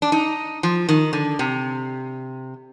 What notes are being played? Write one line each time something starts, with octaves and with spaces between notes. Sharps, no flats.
D4
D#4
F3
D#3
D3
C3